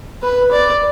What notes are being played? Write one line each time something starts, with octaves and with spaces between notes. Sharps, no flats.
B4
D5